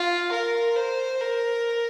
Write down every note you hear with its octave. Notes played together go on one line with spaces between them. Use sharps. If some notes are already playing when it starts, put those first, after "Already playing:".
Already playing: F4
A#4
C5
A#4